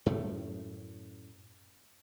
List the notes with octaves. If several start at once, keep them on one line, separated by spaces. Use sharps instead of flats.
F#2 A2 A3